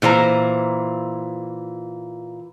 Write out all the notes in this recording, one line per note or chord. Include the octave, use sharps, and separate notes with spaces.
A#2 E3 C5 A#5